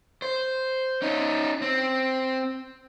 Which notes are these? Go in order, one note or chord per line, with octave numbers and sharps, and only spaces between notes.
C5
C#4 D#4
C4